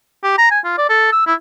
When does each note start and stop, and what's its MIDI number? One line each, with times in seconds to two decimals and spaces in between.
0.24 0.34 67
0.38 0.48 82
0.51 0.59 80
0.65 0.74 65
0.78 0.85 74
0.90 1.10 69
1.12 1.23 88
1.27 1.34 64